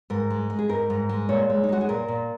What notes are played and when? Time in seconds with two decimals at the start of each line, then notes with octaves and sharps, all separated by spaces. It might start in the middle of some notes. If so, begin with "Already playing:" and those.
0.10 G#2 A#4
0.30 G#3
0.50 G#3
0.59 G#4
0.69 G#2 A#4
0.90 G#2
1.09 G#3
1.29 A#2 C#5
1.50 G#3
1.64 D#4
1.69 G#3 F#4
1.81 G#4
1.89 A#2 A#4
2.08 A#2